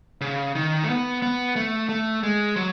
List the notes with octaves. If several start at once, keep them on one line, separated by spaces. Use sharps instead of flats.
C#3
D#3
A3
B3
B3
A3
A3
G#3
F#3